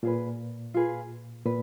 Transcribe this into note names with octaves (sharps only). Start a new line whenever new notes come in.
A#2 F4 G#4 B4
F4 G#4 B4
A#2 B4